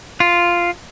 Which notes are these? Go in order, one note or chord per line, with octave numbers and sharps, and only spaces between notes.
F4